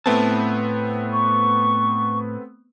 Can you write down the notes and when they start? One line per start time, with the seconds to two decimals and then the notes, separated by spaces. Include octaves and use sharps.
0.06 A2 A3 B3 C4 E5 A5
1.12 C#6